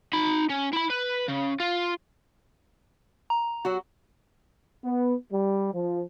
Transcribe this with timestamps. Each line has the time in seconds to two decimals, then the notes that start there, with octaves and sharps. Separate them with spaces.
0.13 D#4 B5
0.50 C#4
0.73 E4 B5
0.90 B4
1.28 C#3
1.60 F4
3.30 A#5
3.65 F#3 F#4
4.84 B3
5.32 G3
5.74 F3